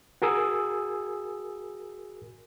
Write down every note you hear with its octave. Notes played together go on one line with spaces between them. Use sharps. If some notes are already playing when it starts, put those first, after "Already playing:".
F#4 G#4 A#4 G#5 D#6 E6